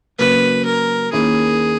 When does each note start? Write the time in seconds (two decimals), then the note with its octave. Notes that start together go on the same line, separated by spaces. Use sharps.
0.19 C#3 F#3 A#3 B4
0.65 A#4
1.12 D#2 D#3 A#3 C#4 E4 G#4